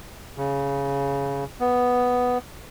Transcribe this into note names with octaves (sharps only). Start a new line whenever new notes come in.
C#3
B3